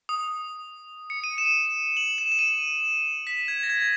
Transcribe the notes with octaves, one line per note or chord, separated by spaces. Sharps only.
D#6
C#7
D#7
E7
F#7
E7
E7
D#7
B6
G#6
A#6
G#6